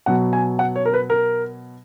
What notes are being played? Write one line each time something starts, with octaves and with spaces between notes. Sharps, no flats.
B2 F#3 F#5
G#5
F#5
C#5
A#4
B4
A#4